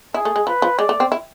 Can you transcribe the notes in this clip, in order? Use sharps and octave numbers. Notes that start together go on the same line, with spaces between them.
E4 G#4
A3
G#3
F3 B4
F3
G#3 D5
A3
C4
E4